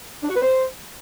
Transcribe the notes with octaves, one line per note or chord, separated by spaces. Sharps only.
D4
F#4
B4
C5